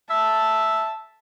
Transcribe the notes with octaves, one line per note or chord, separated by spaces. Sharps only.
E5 A5